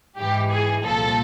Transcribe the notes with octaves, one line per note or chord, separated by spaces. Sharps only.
G#2 E3 G4
G#4
C2 A#2 F3 A4